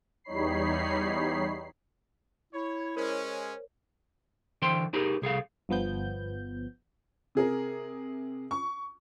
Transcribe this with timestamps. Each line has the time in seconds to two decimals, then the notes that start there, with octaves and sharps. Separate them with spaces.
0.24 E2 G3 D#4 C#5 B5 C7
2.53 E4 C#5
2.97 G#3 C#4 A#4 C5 C#5
4.62 D3 E3 C5 G5 C6
4.93 D#4 G4 G#4 A#4 B4
5.22 C2 G#4 A4 F5
5.69 G1 F3 B3 G6
7.35 C3 G#4 A#4
8.51 C#6